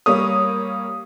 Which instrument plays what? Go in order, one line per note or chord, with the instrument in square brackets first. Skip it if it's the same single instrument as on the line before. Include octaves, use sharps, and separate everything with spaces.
[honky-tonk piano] G3 A#3 C#5 [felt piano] D#6